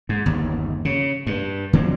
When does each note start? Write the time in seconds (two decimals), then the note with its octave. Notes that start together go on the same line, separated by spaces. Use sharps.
0.09 G#2
0.26 G1 D#2
0.85 C#3
1.27 G2
1.73 D3 F#3 C4